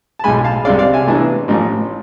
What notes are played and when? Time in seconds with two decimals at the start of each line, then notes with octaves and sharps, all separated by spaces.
0.19 A5
0.24 B1 A2 G#3 G#5 B5
0.44 F5 A5
0.65 C2 C3 G#3 D5 F5
0.79 D5 F5
0.93 E5 G#5
1.07 A1 A2 E3 B3 D4
1.48 A1 A2 F3